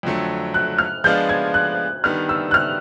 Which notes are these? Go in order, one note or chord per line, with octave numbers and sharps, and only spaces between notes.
F2 D3 F#3 A3
F#6
F6
F3 G#3 B3 D4 F4 G6
G#6
F#6
D#3 G3 B3 D4 F6
E6
F#6
F6